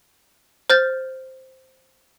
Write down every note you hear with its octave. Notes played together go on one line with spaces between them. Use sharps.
C5 F6 G6 A6